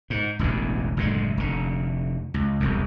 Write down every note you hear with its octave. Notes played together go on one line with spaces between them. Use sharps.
G#2
E1 A1 E2 D3
F#1 A2 D3 G#3
F1 D3
C#2
E1 C2 F2